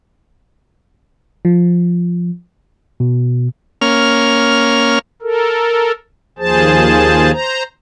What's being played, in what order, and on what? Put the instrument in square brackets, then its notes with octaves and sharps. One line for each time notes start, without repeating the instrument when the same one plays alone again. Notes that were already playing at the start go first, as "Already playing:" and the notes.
[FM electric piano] F3
[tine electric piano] B2
[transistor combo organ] A#3 C#4 F6
[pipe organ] A4 A#4
D#2 F3 G#4 C5 A5
C5 A#5